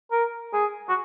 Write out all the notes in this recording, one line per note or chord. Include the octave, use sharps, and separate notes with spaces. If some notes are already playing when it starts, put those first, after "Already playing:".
A#4
G#4
F#4